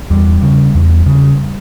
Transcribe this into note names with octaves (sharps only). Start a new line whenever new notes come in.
E2 G3
C#3
E2
C#3